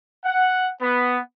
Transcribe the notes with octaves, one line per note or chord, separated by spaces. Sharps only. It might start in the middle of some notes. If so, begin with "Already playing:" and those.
F#5
B3